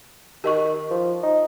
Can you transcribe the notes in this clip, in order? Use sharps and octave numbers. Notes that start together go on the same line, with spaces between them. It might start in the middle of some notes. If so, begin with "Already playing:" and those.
D#3 G4 D#5 C#6
F3
D#4